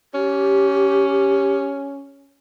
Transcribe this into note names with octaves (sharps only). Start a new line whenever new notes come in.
C#4 G4